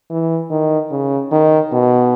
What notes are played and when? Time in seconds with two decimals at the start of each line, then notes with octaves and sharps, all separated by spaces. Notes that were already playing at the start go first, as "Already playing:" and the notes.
0.10 E3
0.50 D#3
0.91 C#3
1.31 D#3
1.72 B2